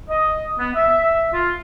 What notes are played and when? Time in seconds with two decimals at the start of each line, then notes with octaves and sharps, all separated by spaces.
0.09 D#5
0.58 B3
0.75 E5
1.33 F4